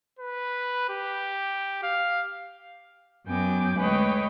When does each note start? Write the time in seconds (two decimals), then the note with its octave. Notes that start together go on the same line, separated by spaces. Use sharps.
0.19 B4
0.89 G4
1.83 F5
3.27 F#2 F#3 B3 G5 G#5 D6
3.79 D2 G#3 B4 C#5 D#5 G5